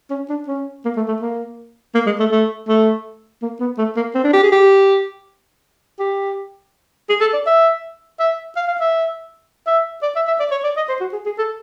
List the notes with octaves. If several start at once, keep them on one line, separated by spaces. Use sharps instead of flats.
C#4
D4
C#4
A#3
A3
A3
A#3
A#3
G#3
A3
A3
A3
A#3
B3
A3
A#3
C4
D4
G4
G#4
G4
G4
G#4
A4
D5
E5
E5
F5
F5
E5
E5
D5
E5
E5
D5
C#5
D5
D#5
C5
F#4
G#4
G#4
A4